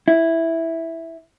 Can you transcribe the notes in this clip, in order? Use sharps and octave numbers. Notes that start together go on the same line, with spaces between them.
E4